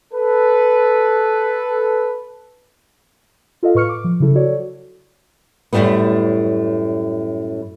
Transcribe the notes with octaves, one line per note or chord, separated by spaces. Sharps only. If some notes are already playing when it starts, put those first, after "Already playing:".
A4 B4
F4 A4 D#5 F5
A2 B4 C#6 F6 C#7
D6
F3
C#3 F#3 E4 A4
F#4 A4 C#5 D5
F#2 A2 D#3 G3 A3 B3